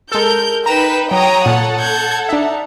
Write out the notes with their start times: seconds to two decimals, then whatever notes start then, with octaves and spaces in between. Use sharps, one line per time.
0.12 G#3 A4 A#4 G6
0.66 D#4 B4 G5 A#5 E7
1.11 F#3 C#5 G5 A#5 D#6
1.46 A#2 A4 F#5
1.80 G6 G#6
2.29 D4 D#4 E5